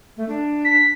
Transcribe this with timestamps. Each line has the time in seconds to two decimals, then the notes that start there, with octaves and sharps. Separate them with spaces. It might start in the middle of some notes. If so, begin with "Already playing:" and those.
0.17 A3
0.29 D4
0.65 B6